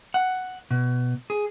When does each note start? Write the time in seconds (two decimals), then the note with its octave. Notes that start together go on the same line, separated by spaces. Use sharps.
0.14 F#5
0.71 B2
1.30 G#4